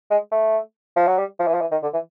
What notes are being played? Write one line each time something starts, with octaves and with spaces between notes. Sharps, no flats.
G#3
A3
F3
F#3
G3
F3
E3
F3
E3
D#3
D3
E3